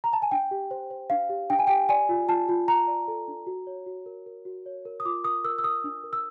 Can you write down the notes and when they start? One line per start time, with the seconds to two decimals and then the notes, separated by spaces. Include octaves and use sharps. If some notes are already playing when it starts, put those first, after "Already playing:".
0.04 A#5
0.13 A5
0.22 G#5
0.31 D4 G5
0.51 G4
0.71 C5
0.90 C5
1.10 D4 F5
1.29 G4
1.50 D4 G5
1.59 G#5
1.67 G4 G5
1.89 D5 G#5
2.09 F4
2.28 F4 A5
2.49 F4
2.68 F4 A#5
2.87 D5
3.08 A4
3.28 D4
3.47 F#4
3.67 C#5
3.86 F#4
4.06 A#4
4.26 A#4
4.45 F#4
4.66 C#5
4.85 A#4
5.00 D#6
5.05 F4 D6
5.24 A#4 D#6
5.44 A#4 E6
5.58 E6
5.64 A#4 D#6
5.84 D4
6.04 A#4
6.13 E6